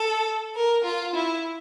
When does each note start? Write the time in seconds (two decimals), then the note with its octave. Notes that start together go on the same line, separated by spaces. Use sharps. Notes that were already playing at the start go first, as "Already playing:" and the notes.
Already playing: A4
0.55 A#4
0.84 F4
1.15 E4